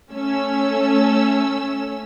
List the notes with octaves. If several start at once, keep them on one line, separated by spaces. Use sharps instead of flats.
A3 C#4 A4 E6